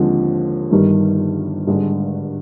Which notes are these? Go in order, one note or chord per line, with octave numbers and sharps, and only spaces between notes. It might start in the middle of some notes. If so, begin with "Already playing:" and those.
Already playing: D#2 D3 F3 G#3 C4
G1 G2 D#3 G3
G#1 G2 D3 G#3